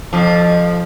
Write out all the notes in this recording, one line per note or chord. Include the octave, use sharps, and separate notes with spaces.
F2 F3